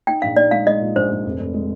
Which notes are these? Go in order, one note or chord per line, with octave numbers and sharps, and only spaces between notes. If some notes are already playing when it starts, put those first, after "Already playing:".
D#4 G5
A#1 F5
D#4 D5
G#3 F5
G#3 D#5
A#2
A#1 C5
A#1
F1
F1
G#3